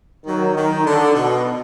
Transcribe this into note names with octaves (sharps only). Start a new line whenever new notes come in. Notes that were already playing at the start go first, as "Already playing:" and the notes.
D#3 F#3
D#3
D3
B2